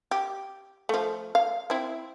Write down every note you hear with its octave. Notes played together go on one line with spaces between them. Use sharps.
G4
F3 A3
F5
C4 E4